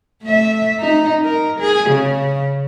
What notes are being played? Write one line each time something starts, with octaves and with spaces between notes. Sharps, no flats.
A3 E5
D#4
A#4
G#4
C#3